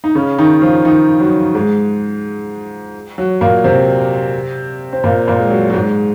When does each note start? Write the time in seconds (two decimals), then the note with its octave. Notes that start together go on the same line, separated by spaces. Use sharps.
0.04 D#4
0.15 C#3 C#4
0.38 D#3 D#4
0.62 F3 F4
0.85 D#3 D#4
1.20 F#3
1.55 G#2 G#3
3.18 F#3
3.41 A#2 A#3
3.64 C3 C4
4.93 C4
5.04 A#2 A#3
5.28 A#2 A#3
5.39 G#3
5.50 F#3
5.70 F#3
5.74 G#2 G#3